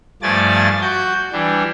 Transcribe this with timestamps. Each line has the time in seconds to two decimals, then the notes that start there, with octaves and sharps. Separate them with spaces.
0.22 G2 F3 A3 D5 G#5 A6
0.81 F#4 G6
1.33 E3 G3 D4